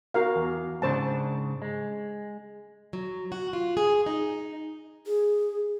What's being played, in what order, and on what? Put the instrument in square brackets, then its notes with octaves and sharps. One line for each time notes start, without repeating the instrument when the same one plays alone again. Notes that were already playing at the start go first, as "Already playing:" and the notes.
[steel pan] F#4 A#4 F5
[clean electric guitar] E2
[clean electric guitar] G#2 C#3 D4 [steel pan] C5 A5
[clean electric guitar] G#3
[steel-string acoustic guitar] F#3
F#4
F4
G#4
D#4
[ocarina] G#4